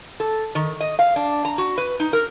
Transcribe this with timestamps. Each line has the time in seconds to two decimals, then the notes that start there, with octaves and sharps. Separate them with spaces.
0.20 A4
0.55 D#3
0.80 D#5
0.99 F5
1.16 D4
1.45 A#5
1.58 F#4
1.78 B4
2.00 D#4
2.13 A#4